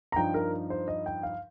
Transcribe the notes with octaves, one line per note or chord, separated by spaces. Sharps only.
A#5
G2 F3 D#4 G5
A#4
C5
D#5
G5
F5